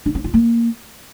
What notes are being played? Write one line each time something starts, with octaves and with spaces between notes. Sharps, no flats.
D4
C#4
F4
A#3